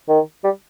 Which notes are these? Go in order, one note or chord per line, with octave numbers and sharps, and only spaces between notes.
D#3
G3